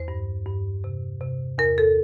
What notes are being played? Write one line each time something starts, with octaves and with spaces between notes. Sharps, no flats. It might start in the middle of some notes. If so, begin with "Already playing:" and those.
Already playing: E2 C5
G2
G2
C3
C3
E2 A#4
A4